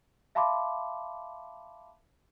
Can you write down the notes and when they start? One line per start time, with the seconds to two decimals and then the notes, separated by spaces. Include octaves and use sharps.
0.35 E5 F5 A5 B5 C6 D6